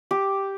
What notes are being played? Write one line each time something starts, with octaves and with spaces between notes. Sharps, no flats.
G4